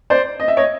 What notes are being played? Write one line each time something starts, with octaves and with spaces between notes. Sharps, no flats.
C5 D5
D#5
E5
C#5 D#5